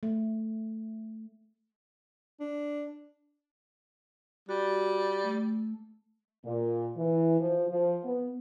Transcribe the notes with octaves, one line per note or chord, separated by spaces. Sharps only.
A3
D4
G3 F#4
A3
A#2
E3
F3
F3
B3